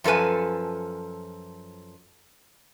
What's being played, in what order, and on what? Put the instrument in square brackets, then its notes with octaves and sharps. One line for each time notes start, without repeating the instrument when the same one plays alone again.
[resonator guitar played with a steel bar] F#2 F3 A4 B4 G#5